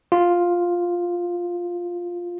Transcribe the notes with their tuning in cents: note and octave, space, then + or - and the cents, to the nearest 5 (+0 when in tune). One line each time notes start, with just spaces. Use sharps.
F4 +5